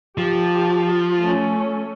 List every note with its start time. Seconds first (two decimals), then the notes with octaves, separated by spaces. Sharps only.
0.18 F3 G4
1.19 A3 C#4